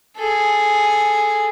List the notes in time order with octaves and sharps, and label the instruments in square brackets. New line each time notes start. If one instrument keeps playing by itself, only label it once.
[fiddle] G#4 A4